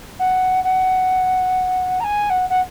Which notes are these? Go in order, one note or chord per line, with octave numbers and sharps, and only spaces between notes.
F#5
F#5
A#5
G#5
F#5
F#5